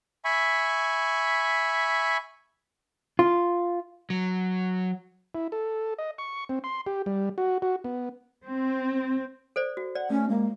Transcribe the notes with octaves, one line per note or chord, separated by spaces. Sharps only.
E5 G#5 B5 C#6
F4
F#3
E4
A4
D#5
C#6
C4
C6
G4
G3
F#4
F#4
B3
C4
A4 C5 D5
F#4
D5 F#5
A3 C#4
G#3 A#3